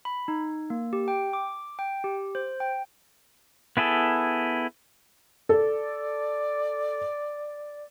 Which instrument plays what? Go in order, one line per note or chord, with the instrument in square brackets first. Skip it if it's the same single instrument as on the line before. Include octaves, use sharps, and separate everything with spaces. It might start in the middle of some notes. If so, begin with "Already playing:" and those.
[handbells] B5
D#4
A#3
G4
G5
D6
G5
G4
C5
G5
[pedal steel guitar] B3 E4 G#4 A4
[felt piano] A4 [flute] D5